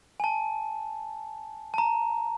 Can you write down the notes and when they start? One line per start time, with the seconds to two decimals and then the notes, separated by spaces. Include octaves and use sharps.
0.20 G#5
0.24 A5
1.74 A5
1.78 A#5